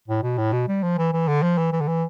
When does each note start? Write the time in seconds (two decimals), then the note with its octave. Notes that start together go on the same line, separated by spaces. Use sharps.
0.08 A2
0.23 B2
0.38 A2
0.52 B2
0.68 G3
0.83 F3
0.98 E3
1.13 E3
1.28 D3
1.43 F3
1.58 E3
1.73 E3
1.81 D3
1.88 E3